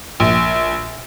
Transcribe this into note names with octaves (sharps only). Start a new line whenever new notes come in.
A#1